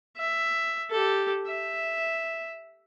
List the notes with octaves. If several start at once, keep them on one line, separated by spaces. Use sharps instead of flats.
E5
G4 A4
E5